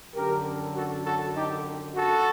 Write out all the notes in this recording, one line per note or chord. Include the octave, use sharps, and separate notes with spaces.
F#2 D3 G4 A#4
F#4 A4
F#4 A4
D#4 G4
F#4 A4